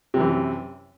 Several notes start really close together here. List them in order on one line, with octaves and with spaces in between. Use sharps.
C3 F#2 E3